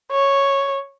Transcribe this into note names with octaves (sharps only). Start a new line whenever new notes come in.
C#5